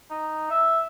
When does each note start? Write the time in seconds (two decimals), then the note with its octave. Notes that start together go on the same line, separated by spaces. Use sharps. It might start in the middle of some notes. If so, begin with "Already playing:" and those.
0.10 D#4
0.50 E5